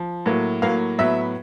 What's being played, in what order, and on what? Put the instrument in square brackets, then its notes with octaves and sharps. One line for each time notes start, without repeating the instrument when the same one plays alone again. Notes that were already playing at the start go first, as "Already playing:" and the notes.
Already playing: [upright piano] F3
A2 F#3 A#3
A2 F#3 A#3 F5
A2 F#3 B3 E5